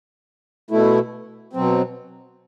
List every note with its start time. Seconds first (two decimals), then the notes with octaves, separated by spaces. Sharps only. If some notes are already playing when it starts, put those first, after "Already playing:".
0.71 B2 A3 E4
1.53 B2 F#3 C4